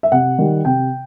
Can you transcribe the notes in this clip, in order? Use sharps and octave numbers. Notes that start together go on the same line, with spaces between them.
E5
C3 F#5
D#3 G3
C3 G5